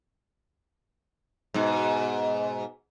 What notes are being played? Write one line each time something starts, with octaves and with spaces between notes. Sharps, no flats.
G#2 B2